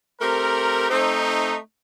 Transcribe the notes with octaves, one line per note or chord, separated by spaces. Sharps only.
A3 C4 G4 A#4
A3 C4 D#4